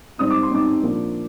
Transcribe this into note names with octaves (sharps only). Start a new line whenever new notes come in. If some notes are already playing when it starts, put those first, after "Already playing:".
G#2 G3 C4 D#4 D#6
D6
C6
G#2 G3 C4 D#4 D6
A#2 F3 A#3 D4